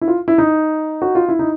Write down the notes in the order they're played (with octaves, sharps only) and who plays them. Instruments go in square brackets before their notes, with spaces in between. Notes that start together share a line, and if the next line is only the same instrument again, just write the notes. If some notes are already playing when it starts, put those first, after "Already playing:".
[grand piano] E4
F4
E4
D#4
F#4
F4
E4
D#4